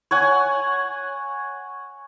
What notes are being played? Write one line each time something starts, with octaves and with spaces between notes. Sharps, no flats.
C#5 F#5 G#5